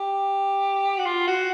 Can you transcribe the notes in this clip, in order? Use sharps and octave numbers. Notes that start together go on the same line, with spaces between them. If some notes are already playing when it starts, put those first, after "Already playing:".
Already playing: G4
F#4
F4
F#4